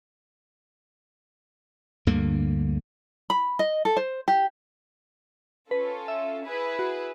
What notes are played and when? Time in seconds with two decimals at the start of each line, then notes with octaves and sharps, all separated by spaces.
2.07 D2 G2 D3 A#3
3.30 B5
3.59 D#5
3.85 A4
3.97 C5
4.28 G4
5.71 C#4 F4 A4 B4
6.08 E5
6.45 E4 G#4 B4
6.79 F#4